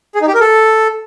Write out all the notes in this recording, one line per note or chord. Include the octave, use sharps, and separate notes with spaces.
G#4
D#4
G4
A#4
A4